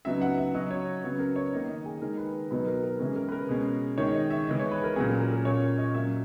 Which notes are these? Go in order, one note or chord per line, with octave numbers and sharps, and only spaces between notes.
C#3 F#3 B3 D#4 E5
F#5
E5
C#3 F#3 C#4 D#5
C#5
C#3 F#3 B3
A#4
C#5
D#3 A#3 D#4 D#5
D#5
G#4
D#3 G#3 D#4 A#4
B4
B2 F#3 B3 D#4 B4
A#4
A#4
E3 G#3 C#4 A#4
A#4
B4
A#4
B2 G#3 C#4
D#3 G#3 D#4 C#5
D#5
E5
E3 G#3 D#4 D#5
C#5
B4
A#4
A#2 F#3 C#4 G#4
A#4
A#4
A#4
A#2 A#3 C#4 C#5
D#5
A#2 F#3 C#4 E5